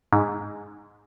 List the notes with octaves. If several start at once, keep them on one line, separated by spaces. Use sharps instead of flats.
G#2